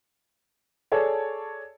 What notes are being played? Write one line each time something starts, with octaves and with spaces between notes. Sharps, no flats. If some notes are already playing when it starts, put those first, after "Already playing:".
G#4 A4 C#5 D5 A5